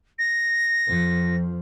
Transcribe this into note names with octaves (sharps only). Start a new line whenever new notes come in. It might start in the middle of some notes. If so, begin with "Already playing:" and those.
A#6
F2 F3